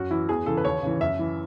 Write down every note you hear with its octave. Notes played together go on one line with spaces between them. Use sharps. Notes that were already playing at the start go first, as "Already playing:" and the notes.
Already playing: F#2 F#4
E3 E4
E2 G#4
C#3 E3 A4
B4
D#2 C#5
C#3 E3
F#2 E5
E3